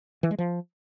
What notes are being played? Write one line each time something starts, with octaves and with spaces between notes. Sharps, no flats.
E3
G#3
F3